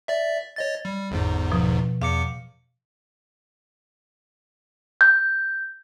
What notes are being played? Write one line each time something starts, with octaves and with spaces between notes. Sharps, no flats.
D5 E5
C#5 D#5 A6
G3
G1 E2 G#2
B2 F3
E2 F5 D6 C#7
G6